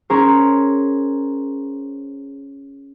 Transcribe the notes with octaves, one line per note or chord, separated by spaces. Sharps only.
C#4 G#4 A#4 C5